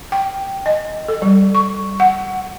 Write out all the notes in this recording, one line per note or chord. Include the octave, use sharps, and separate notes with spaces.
G5
D#5
A4
G3
C#6
F#5